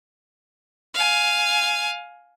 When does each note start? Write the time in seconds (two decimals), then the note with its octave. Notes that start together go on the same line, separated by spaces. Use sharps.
0.95 F5 G#5